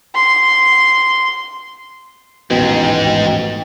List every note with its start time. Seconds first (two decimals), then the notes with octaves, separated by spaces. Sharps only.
0.15 C6
2.51 D#1 A1 G#2 B2 G5